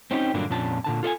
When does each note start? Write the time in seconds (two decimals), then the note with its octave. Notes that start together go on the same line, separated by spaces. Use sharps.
0.11 C4 C#4 D#4 F4 G4
0.34 G2 A#2 D3 F#3 A#3 D4
0.50 F2 A#2 C#4 D4 A5
0.84 A#2 D3 A5
1.03 F4 A4 D#5 G#5